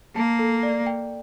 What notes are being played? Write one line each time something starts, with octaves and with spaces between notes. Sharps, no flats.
A#3 A5
A4
D5
G5